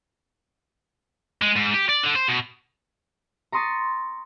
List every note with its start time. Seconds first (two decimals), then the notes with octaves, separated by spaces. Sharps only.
1.42 G#3
1.57 G#2
1.74 G4
1.89 D5
2.03 D3
2.15 C5
2.28 B2
3.52 A#5 C6 C#6 D#6 A6 B6